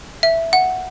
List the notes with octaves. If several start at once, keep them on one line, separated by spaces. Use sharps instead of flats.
E5
F#5